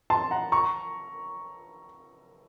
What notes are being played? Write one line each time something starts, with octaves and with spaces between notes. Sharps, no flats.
A5 C6
F#5 A#5
A#5 C#6